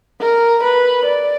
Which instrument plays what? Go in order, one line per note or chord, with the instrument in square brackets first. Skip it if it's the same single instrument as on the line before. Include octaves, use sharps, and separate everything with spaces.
[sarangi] A#4
B4
D5